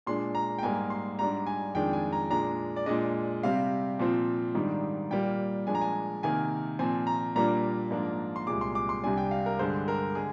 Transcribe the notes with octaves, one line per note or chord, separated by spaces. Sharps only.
A#2 G#3 D4 C6
A#5
G5
G#2 G3 A#3 G#5
C6
G#2 G3 D4 A#5
G#5
F2 D#3 G#3 D4 G5
G#5
A#5
A#2 G#3 D4 A#5
D5
A#2 G#3 D4 D#5
C3 G3 C4 F5
A#2 F3 C4
G#2 D#3 G3 D4
A#2 G3 A#3 G5
A#2 F3 G#3 D4 G#5
A#5
G#5
C3 D#3 A#3 G#5
A#2 F3 C4 G#5
A#5
A#2 G3 A#3 D4 A#5
G#2 F3 A#3 D4
C6
C2 A#2 G#3 D6
C6
D6
C6
C2 C3 G3 D4 G#5
G5
F5
A#4
G2 D3 G#3 C5
A#4
D3 G#3 G#4